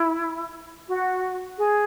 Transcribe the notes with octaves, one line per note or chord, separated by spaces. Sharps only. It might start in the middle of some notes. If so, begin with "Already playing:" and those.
Already playing: E4
F#4
G#4